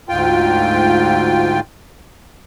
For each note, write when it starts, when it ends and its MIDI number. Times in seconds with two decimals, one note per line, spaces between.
0.09 1.60 38
0.09 1.60 44
0.09 1.60 65
0.09 1.60 79